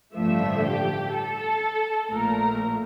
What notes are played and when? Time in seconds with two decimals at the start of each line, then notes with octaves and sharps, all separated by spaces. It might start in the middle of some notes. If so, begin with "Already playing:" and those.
0.15 A1 G2 D3 F3 A3 E5
0.65 G4
1.13 A4
2.10 A#1 A#2 A3 A#4